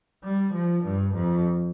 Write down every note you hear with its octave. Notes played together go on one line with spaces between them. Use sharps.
G3
F3
G2
F2